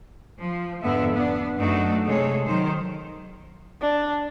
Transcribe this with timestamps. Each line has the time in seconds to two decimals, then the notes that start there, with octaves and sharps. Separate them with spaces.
0.41 F3
0.83 F2 G#2 D3 B3 E5
1.13 B3 D4
1.57 F#2 A3 D4 D#4 F#4
2.04 C3 G#3 G#4 A4 C#5
2.46 D#3 F#3 C5
3.81 D4